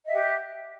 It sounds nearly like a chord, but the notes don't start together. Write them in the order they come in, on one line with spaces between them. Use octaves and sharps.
D#5 E5 F#5 G4